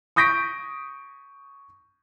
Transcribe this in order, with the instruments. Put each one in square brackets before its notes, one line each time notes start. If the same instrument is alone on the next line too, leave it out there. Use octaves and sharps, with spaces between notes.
[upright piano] C#6 D#6 G6 A#6 B6 D7